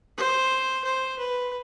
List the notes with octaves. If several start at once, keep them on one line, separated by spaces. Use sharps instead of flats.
C5
C5
B4